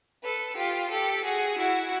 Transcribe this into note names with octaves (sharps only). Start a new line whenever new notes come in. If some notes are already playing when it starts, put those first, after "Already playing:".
A4 B4
F4 G4
G4 A4
F#4 G#4
E4 F#4